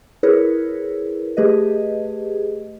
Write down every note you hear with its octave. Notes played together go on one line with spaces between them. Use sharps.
E4 G#4 A#4 B4 C#5
A3 G4 G#4 B4 D#5